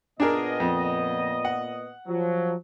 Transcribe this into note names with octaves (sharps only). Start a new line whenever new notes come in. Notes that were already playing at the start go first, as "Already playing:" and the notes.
A#2 B3 D4 G#4 A#4 D#5
F2
F#5
F3 F#3